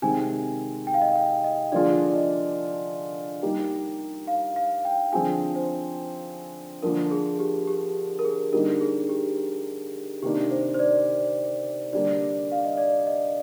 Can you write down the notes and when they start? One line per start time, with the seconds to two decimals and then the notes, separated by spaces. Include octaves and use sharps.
0.02 C3 D#3 G#3 C4 G#5
0.87 G5
0.94 F5
1.02 D#5
1.08 F5
1.16 G5
1.44 D#5
1.72 D3 F3 A#3 F4 G#4 D5
2.08 D5
2.16 D#5
3.43 G3 A#3 D#4 G4
4.27 F5
4.56 F5
4.85 G5
5.12 D3 F3 C4 F4 G#4 G#5
5.56 C5
6.82 D3 F3 A#3 A#4
7.11 G#4
7.39 G4
7.67 G4
8.19 A#4
8.24 G#4
8.52 D3 G3 A#3 D#4 A#4
8.81 G#4
9.09 G4
10.22 C3 D#3 A#3 D4 G4
10.51 C5
10.74 C5
10.79 D5
11.93 D3 G3 A#3 D5
12.52 F5
12.65 D#5
12.78 D5
13.07 D#5